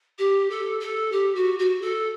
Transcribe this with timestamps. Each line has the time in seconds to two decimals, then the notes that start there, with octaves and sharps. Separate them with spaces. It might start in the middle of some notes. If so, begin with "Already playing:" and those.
0.18 G4
0.50 A4
0.80 A4
1.12 G4
1.35 F#4
1.59 F#4
1.81 A4